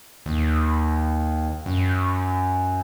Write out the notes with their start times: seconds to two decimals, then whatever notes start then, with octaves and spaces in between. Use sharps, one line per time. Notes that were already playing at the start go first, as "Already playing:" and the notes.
0.26 D#2
1.66 F#2